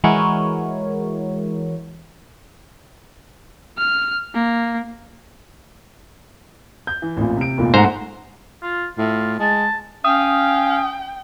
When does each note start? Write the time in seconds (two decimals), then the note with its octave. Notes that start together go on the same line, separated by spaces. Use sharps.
0.04 E3 G#3 E4 F#4 A#4 C#5
3.78 F6
4.34 A#3
6.87 G6
7.02 E3
7.17 A1 F2 A#2
7.37 C3 D7
7.58 F1 E2 A#2
7.74 G#2 A3 C5 F#5 A#5
8.62 F4
8.98 A2 F4
9.39 G#3 A5
10.04 C#4 F5 G5 D#6